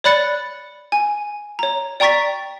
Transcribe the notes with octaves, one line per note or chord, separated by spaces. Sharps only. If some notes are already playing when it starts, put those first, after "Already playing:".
C#5 D5 B5 F#6 A6 C#7
G#5
C#5 A#5
D5 G5 A#5 C#6 A6 B6